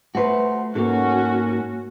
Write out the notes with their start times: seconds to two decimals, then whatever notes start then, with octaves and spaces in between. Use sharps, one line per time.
0.15 A3 F#4 B4 C5
0.75 G#2 A#3 C#4 F#4 A4